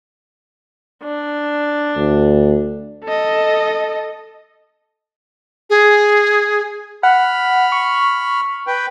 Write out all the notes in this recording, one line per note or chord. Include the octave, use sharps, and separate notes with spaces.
D4
D2
A4 D#5
G#4
F#5 B5 F6
C#6
B4 G5